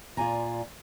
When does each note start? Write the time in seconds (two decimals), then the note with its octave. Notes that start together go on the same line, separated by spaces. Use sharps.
0.17 A#2 F4 B4 D5 G#5 A#5